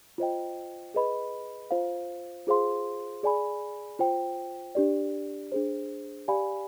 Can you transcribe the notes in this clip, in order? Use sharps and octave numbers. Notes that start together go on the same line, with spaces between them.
F4 C5 D#5 G5
G#4 B4 D#5 B5
F4 C5 F5
F4 G#4 C5 F5 C6
G#4 D5 G#5 B5
F4 C5 G5
D4 G4 D5
D4 G#4 C5
G4 D5 F5 G#5 B5